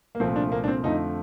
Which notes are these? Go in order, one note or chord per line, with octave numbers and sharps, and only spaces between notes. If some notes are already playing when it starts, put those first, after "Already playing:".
A#3
C2 A#2 F3 A3 C4
D4
A#3
D4
C4
F2 D3 F3 A3 D#4